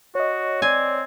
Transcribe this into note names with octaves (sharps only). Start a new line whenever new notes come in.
F#4 C#5 D#5
C4 D5 G#5